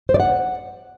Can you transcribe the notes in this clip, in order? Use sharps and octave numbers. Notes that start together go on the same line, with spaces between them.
C5
D5
F#5